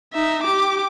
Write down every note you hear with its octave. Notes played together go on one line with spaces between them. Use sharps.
D#4 E5
G4 D6